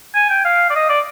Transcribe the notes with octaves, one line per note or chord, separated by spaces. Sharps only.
G#5
G5
F5
D5
D#5
D5